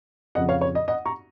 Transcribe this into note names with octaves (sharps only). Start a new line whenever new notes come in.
F2 C#3 F3 D#5 F#5
C#5 F5
C#5
D#5
D#5 F#5
A#5 C#6